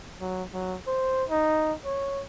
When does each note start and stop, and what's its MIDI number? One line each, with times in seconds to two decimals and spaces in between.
0.21 0.43 54
0.53 0.76 54
0.87 1.24 72
1.30 1.73 63
1.85 2.23 73